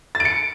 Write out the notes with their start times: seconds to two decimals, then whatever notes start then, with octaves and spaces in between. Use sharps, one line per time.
0.15 A6
0.20 D7
0.25 C#7